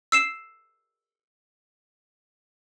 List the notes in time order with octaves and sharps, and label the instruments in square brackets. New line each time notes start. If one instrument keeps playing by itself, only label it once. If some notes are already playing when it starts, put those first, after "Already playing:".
[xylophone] E6 C7 E7